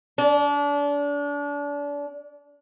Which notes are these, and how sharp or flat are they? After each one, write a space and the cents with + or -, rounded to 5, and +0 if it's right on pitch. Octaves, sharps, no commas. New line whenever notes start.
D4 -30